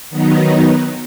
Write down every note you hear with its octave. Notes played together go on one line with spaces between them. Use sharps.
D#3 F#3 B3 D#4